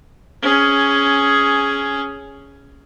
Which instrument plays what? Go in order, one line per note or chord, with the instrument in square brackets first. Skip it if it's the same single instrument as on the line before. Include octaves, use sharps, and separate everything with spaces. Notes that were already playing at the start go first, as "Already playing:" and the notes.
[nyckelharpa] C#4 G#4